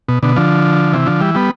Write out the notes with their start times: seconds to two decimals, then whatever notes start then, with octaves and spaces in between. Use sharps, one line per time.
0.09 B2
0.23 B2 D3
0.36 D3 F3
0.93 C3 E3
1.06 D3 F3
1.21 E3 G3
1.35 G3 B3